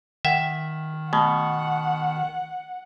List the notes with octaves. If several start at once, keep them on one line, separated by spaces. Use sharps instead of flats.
D#3 E5 F#5 G5
B2 A3 F#5